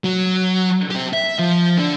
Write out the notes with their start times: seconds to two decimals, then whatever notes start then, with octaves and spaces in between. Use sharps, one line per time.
0.04 F#3
0.91 C4 G4
1.13 E5
1.39 F3
1.77 D3 D4